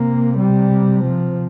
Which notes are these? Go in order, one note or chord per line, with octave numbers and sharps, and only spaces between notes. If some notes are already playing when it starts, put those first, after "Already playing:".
Already playing: C3 A#3
G3
F3